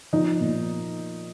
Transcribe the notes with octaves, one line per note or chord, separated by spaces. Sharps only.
F3 D#4
A#2